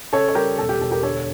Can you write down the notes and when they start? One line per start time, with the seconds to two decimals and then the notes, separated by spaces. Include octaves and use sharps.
0.13 C#3 A4 C#5
0.29 C#5
0.35 G3 G4 A#4
0.58 E1 A4
0.69 G4
0.81 E1 A4
0.91 G4 A#4
1.03 D3 A4 C#5